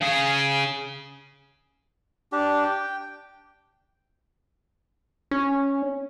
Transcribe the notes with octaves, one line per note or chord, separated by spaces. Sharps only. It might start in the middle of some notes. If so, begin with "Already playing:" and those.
C#3 G#4
D4 G4
G5
C#4